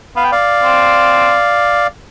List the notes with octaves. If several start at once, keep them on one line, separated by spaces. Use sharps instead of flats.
B3 F5
G5
D5 F5
C4